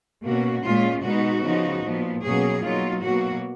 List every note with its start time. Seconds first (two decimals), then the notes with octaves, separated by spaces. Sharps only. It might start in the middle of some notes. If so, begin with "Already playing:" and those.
0.24 B2 A#3 C#4 F#4
0.64 A#2 G#3 C#4 F4
1.04 B2 G#3 B3 D#4 F#4
1.44 C#3 F3 B3 D#4
1.84 A#2 F3 B3
2.24 B2 F#3 A#3 C#4 G#4
2.63 B2 F#3 A#3 D#4 F4
3.03 B2 F#3 A#3 F#4